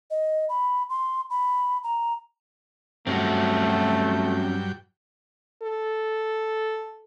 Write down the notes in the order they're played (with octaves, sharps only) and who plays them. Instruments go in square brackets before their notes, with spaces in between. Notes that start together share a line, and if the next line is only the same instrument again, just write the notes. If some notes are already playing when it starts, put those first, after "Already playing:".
[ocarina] D#5
B5
C6
B5
A#5
[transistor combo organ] G2 F#3 G5 [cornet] A3 [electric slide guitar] C4 C#4 F#4
[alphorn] A4